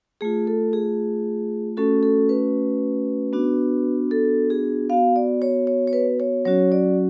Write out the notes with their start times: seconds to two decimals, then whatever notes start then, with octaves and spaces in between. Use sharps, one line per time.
0.21 A3 F4 G#4
0.47 A4
0.73 G#4
1.77 A3 C#4 F#4 A4
2.03 A4
2.29 B4
3.33 B3 D4 F#4
4.11 A4
4.50 G#4
4.90 B3 F#4 F5
5.16 D5
5.42 C#5
5.67 C#5
5.88 C#5
5.93 B4
6.20 C#5
6.45 F#3 C#4 F#4 C#5
6.72 D5